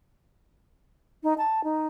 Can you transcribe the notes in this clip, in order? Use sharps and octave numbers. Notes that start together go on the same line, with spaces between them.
D#4
A5
D#4